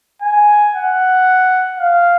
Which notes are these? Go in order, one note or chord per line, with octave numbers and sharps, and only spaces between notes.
G#5
F#5
F5